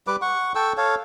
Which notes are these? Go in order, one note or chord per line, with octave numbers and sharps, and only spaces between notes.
G3 B4 D6
F#5 C#6
A4 G5 C#6 E6
A4 C#5 F5